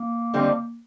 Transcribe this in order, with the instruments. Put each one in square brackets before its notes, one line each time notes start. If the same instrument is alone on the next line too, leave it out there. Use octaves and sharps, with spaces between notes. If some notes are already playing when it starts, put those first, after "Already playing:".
Already playing: [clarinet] A#3
[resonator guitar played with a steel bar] D3 G3 C4 D#4